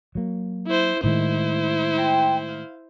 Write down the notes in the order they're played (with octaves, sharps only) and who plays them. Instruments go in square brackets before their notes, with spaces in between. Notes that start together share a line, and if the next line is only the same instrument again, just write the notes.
[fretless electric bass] F#3 A#3
[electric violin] E4 C5
[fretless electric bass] A2 D#3 G#3 [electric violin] E4 C5
[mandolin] G5 A#5 C6
F5